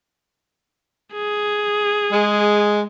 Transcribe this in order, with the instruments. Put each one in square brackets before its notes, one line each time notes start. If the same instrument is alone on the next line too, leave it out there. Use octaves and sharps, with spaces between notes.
[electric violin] G#4
[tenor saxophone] G#3